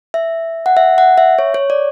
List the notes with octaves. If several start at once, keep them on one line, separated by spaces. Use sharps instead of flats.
E5
F#5
E5
F#5
E5
C#5
C#5
D5